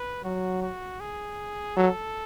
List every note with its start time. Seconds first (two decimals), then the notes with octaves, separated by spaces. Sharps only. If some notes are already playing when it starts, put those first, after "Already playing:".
Already playing: B4
0.24 F#3 F#4
0.62 F#4
1.00 G#4
1.77 F#3 A4